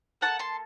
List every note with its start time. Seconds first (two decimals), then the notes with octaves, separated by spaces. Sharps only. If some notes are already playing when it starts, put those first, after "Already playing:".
0.21 A#3 F#4 F#5 A5
0.26 A4
0.39 A5 C6